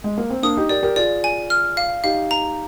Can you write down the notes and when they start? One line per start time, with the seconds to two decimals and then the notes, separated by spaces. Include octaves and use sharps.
0.04 G#3
0.18 A#3
0.30 C4
0.43 A#3 D4 D#6
0.57 D#4 G4
0.69 G4 A#4 D5
0.83 G4 A#4
0.96 F4 G#4 D5
1.24 G#5
1.50 F6
1.77 F5
2.04 D#4 G4 F5
2.31 A#5